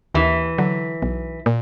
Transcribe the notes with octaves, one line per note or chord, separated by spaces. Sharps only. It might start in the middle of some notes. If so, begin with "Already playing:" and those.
D#2 E3
D3 F#3
B1
A#2